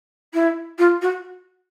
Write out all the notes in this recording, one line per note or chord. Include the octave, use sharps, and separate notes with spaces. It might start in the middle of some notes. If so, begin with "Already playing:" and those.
E4
F4
F#4